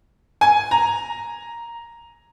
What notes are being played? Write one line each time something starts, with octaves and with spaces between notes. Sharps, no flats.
G#5
A#5